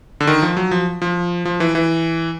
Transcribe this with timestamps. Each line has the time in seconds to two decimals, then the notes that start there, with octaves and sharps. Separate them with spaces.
0.20 D3
0.27 D#3
0.42 F3
0.57 F#3
0.71 F3
1.02 F3
1.45 F3
1.60 E3
1.75 E3